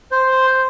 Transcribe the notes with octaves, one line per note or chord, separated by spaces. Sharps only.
C5